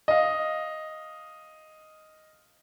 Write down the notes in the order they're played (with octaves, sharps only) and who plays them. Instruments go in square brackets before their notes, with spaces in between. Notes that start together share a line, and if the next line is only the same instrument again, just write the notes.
[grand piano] D#5 F5